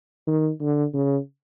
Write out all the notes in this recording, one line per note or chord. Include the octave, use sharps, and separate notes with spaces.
D#3
D3
C#3